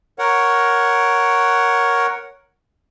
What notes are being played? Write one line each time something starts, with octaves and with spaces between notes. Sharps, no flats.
A#4 C#5 F#5